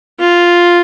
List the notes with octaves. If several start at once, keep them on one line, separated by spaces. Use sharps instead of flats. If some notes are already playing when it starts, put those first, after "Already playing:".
F4